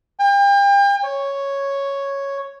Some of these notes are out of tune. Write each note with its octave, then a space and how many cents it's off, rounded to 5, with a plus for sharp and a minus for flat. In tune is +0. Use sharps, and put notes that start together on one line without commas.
G5 +40
C#5 +0